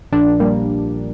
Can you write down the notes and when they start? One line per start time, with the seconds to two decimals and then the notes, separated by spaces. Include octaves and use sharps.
0.12 A#1 D4
0.39 A#2 G3 A#3